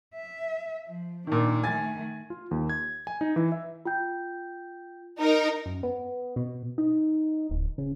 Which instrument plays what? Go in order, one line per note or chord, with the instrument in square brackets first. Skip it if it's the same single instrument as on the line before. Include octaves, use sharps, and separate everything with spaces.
[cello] E5
F3
[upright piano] A#2 D#3 [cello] D4
[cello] D#3 A3 [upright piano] G#5 A6
[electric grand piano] F4
D#2
G#6
G#5
D#4
E3
E5
[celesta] F4 G5 G6
[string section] D#4 A#4
[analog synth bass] F#2
B3
B2
D#4
D1
C#3